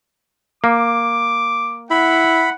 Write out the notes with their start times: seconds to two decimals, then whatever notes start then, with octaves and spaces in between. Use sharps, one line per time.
0.64 A#3 D6
1.90 E4 F#5 B5